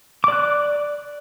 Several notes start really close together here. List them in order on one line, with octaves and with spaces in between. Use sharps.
D6 D5 F#6